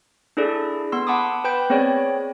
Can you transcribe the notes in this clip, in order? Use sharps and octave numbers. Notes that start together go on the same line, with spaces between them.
D4 E4 G#4 A4 D5
B3 C6 E6
F#5 A5 B5 D6 D#6
B4 G5 B5 G6
B3 C4 G#4 C#5 D5 G5